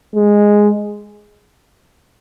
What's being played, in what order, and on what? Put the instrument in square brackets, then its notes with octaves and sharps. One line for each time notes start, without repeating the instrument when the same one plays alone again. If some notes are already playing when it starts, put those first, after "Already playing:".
[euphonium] G#3